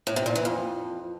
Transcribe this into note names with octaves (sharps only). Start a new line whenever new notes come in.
A2
C3
A#2
E3
F2